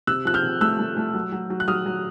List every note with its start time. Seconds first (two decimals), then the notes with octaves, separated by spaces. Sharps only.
0.07 C3 E6 F#6
0.25 F3 F#6
0.34 F6 G6
0.43 C3
0.61 A3 E6 F#6
0.79 A3
0.97 A3
1.14 F#3
1.32 F#3
1.50 F#3
1.60 F#6
1.68 F#3 D#6 F6
1.86 F#3